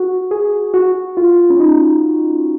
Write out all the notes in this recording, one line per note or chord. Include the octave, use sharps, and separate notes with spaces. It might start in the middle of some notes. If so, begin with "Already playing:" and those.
Already playing: F#4
G#4
F#4
F4
C#4
D#4